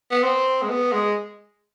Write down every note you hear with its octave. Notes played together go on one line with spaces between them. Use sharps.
B3
C4
G#3
B3
G#3